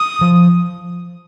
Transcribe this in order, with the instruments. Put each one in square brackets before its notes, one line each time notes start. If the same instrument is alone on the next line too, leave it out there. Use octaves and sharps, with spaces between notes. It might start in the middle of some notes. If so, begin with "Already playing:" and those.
Already playing: [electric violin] D#6
[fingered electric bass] F3